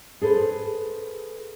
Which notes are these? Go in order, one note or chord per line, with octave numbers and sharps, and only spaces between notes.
G#4 A4 B4 C5